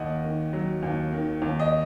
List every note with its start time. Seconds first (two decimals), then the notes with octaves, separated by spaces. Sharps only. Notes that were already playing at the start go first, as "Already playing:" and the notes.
Already playing: D#2 D#5 F#5
0.24 D#3
0.53 F#3
0.83 D#2
1.13 D#3
1.42 D#2
1.60 D#5